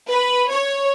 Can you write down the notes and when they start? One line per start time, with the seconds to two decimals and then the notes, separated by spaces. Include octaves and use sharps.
0.10 B4
0.50 C#5